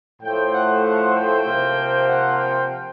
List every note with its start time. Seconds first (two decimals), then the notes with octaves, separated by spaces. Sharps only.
0.22 A2 F3 A3 G5
0.53 F#5
0.84 F#5
1.15 G5
1.46 C3 F3 A#3
2.08 F#5
2.39 G5